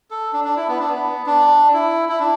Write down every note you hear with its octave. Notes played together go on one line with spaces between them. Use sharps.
A4
D4
D4
E4
B3
D4
B3
D4
E4
E4
D4